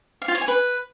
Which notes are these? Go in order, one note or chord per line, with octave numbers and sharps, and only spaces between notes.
F5
F4
C#5
G#5
B4